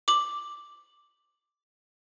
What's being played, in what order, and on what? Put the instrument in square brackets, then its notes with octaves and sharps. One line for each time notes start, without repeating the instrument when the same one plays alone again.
[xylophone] D6 F#7